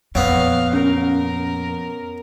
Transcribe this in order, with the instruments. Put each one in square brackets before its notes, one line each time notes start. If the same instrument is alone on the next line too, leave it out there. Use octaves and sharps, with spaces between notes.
[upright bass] F2 A#2 [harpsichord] F#3 B3 [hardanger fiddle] F5
[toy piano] C#4 [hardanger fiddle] A#4